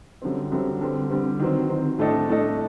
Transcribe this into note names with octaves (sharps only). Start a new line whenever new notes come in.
F#2 D3 G3 C4
F#2 D3 G3 C4
D3 G3 C4
D3 G3 C4
D#3 F#3 C4
D#3 F#3 C4
A2 A3 D4 A4 D#5
A2 A3 D4 A4 D#5